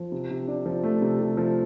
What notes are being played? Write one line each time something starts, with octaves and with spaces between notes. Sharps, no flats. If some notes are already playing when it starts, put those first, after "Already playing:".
Already playing: F3
C3
C3
D4
F3
A3
C3
C3
F3